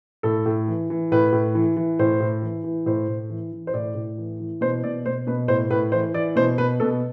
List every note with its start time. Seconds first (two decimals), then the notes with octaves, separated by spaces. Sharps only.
0.23 A2 A4
0.46 A2
0.68 E3
0.90 E3
1.12 A2 B4
1.33 A2
1.55 E3
1.77 E3
1.99 A2 C5
2.20 A2
2.43 E3
2.64 E3
2.86 A2 C5
3.08 A2
3.30 E3
3.53 E3
3.67 C5
3.74 A2 D5
3.95 A2
4.18 E3
4.40 E3
4.61 B2 C5
4.83 B2 D5
5.06 B2 C5
5.27 B2 B4
5.48 A2 C5
5.71 A2 B4
5.92 E3 C5
6.14 E3 D5
6.36 B2 C5
6.58 B2 B4
6.80 B2 A4